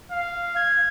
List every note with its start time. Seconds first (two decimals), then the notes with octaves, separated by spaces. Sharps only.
0.12 F5
0.56 G#6